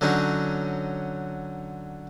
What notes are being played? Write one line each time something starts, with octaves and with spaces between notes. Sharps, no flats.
D3 F#3 C#4 D#4 F#4